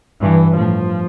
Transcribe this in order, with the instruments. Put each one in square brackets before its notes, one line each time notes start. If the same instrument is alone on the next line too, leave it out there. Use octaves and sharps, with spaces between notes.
[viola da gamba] G2 [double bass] E3
[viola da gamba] A2 [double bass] F3